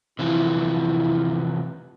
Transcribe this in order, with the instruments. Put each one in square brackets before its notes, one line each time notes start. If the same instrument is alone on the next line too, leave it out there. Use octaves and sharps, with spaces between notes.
[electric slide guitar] C3 E3 F3 [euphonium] E4